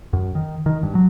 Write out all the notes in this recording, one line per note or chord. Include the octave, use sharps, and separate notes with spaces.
F#2
D#3
D#3
G2
F#3